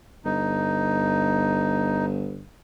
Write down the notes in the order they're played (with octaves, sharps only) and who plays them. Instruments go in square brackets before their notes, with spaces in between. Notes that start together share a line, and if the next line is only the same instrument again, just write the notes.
[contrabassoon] G1 [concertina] D#4